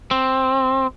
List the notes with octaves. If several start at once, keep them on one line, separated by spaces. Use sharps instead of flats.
C4